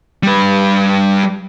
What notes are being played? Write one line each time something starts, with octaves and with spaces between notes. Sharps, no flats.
G3 B4